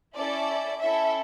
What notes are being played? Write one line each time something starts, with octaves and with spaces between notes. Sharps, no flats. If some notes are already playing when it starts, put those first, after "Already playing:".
C#4 E4 A4 D5
C#4 E4 A4 E5